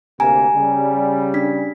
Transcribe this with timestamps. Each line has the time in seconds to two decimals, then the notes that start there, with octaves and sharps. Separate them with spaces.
0.20 D2 C3 A#3 G#5 A#5
0.56 C#3 G3
1.34 D4 B6